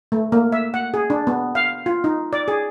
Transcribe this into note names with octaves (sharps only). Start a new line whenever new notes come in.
A3
A#3
E5
F#5
G#4
D4
B3
F5
F4
D#4
D5
G#4